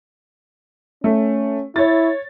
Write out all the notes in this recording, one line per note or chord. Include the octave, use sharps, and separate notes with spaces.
A3 C#4
E4 C#5 A6